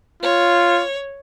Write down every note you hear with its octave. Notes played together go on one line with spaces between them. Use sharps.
F4 C#5